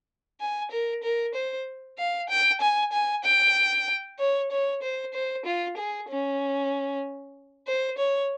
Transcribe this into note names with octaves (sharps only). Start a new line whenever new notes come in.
G#5
A#4
A#4
C5
F5
G5
G#5
G#5
G5
C#5
C#5
C5
C5
F4
G#4
C#4
C5
C#5